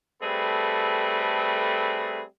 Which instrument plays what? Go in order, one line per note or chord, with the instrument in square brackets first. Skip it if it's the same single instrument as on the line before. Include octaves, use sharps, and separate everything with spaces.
[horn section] G3 A3 C4 G#4 A4 B4